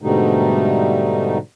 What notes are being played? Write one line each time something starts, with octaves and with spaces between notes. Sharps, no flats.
G#2 B2 D3 G3 A3 D#4